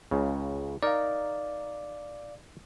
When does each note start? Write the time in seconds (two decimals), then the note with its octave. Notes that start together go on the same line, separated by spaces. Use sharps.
0.11 C#2 C#3
0.83 D#4 A#4 D5 F5